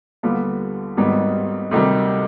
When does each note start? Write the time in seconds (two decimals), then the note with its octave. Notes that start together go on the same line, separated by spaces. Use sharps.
0.23 D#2 D3 G3 B3 F4
0.97 G#1 G#2 D#3 G3 B3
1.71 D2 C3 D#3 G3